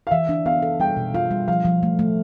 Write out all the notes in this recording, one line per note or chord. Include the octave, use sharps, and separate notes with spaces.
F5
E3 E5
D4
B3 F5
A4
G3 G5
B2
F4 F5
G3
F3 F5
F3
A3
A3